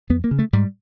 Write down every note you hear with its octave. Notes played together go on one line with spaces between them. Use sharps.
F2 B3
A#3
C#3
A3
G#2 G3